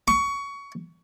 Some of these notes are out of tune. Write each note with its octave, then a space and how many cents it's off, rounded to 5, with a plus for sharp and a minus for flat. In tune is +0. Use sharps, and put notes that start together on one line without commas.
C#6 +20